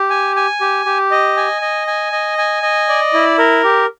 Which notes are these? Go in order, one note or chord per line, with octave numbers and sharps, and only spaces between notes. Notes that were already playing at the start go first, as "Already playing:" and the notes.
Already playing: G4
G#5
G#5
G4
G4
D#5
G#5
D#5
G#5
D#5
G#5
D#5
D5
E4
A#4
G4